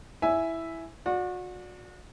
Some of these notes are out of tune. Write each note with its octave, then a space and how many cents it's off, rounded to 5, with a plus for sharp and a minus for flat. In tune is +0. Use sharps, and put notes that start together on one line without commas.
E4 +0 E5 +0 G#5 +0
F#4 -35 D5 +0